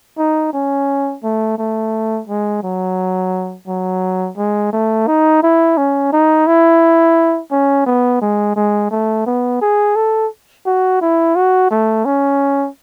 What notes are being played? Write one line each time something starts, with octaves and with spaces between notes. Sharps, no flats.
D#4
C#4
A3
A3
G#3
F#3
F#3
G#3
A3
D#4
E4
C#4
D#4
E4
C#4
B3
G#3
G#3
A3
B3
G#4
A4
F#4
E4
F#4
A3
C#4